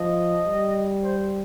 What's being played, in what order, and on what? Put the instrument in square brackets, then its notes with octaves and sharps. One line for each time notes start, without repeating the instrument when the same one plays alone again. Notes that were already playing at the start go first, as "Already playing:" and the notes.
Already playing: [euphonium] F3 [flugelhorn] D#5
[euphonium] G3
[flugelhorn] C5